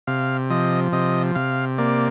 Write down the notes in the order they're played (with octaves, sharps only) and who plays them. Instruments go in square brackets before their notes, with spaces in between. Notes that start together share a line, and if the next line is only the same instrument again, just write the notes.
[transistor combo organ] C3 F5
F3 D#5
C3 D#5
C3 F5
A#3 D5